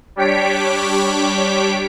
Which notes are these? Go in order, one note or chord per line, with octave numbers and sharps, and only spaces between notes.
G3 D4 G4 C#5 B6 D7